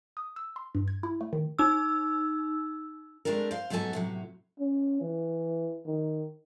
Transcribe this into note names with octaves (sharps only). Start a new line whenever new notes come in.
D#6
E6
C6
G2
G#6
E4
A3
D#3
D#4 E6
G#3 A3 C4 D4 A#4
C5 F5
G#2 F#3 B3 D4 A4 G#5
A2 C3 F#3
C#4
E3
D#3